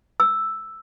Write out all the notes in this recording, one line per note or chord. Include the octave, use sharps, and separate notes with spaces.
E6